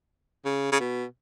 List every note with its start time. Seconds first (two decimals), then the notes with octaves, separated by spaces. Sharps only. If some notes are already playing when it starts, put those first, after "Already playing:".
0.45 C#3
0.72 C#3
0.80 B2